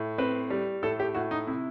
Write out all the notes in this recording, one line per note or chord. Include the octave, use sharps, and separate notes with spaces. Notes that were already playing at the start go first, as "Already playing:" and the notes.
Already playing: A2
C4 B4
G3
A2 A4
G4
A2 F#4
D#4
C3 E4